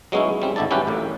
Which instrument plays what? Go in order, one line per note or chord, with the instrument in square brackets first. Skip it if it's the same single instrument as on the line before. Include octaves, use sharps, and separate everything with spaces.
[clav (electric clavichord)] F#3 G#3 B3 C#4 D#4 E4
G3 C4 C#4
G#1 D3 E4 D5 A5
G3 C#4 E4 F#4 G4 B4
A1 A2 A#3